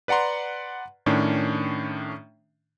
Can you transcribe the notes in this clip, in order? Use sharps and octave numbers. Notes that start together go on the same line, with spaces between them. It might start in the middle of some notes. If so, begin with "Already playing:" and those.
B4 D5 F#5 A#5 C6
A2 D#3 C#4 D4